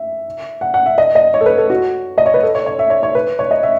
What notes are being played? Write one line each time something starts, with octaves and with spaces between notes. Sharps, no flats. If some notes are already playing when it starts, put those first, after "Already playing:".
Already playing: E5
F#5
F#5
E5
D#5
D#5
C#5
A4
B4
A4
F#4
D#5
C#5
B4
A4
C#5
C#5
E5
C#5
C#5
B4
C#5
D#5
E5